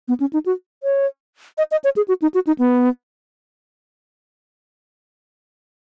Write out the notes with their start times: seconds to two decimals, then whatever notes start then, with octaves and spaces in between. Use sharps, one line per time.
0.08 B3
0.20 C#4
0.33 D#4
0.46 F#4
0.83 C#5
1.58 D#5
1.71 D#5
1.84 C#5
1.97 G#4
2.08 F#4
2.22 D#4
2.34 F#4
2.47 D#4
2.59 B3